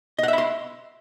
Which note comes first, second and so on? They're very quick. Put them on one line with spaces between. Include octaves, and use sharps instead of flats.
D#5 F#5 E5 B5 C6